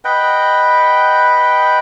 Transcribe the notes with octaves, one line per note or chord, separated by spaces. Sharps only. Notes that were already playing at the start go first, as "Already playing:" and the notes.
B4 D#5 F#5 G5